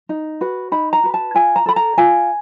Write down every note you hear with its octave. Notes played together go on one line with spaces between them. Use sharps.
D#4
F#4 B4
D#4 B5
A#5
F#4 B4
A5
F4 G#5
A#5
A4 B5
A#5
F4 G#5